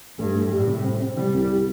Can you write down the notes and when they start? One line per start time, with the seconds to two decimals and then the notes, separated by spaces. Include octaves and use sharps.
0.19 G2 A3
0.35 A3
0.51 A2 G3
0.67 C3
0.84 C4
1.01 C4
1.17 C3 G3
1.34 C2
1.50 G4